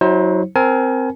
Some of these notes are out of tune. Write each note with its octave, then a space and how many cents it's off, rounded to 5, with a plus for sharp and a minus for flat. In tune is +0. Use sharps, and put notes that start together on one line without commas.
F#3 +5 E4 -35 C5 +25
C4 +0 A#4 +0 G#5 +30